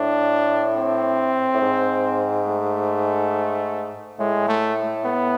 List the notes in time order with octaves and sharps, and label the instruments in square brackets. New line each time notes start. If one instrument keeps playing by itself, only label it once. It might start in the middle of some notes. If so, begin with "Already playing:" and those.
Already playing: [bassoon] A2 [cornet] D4
[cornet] C4
[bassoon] A2
G#2
[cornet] A3
[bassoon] A2 [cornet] G#3
[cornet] A3
B3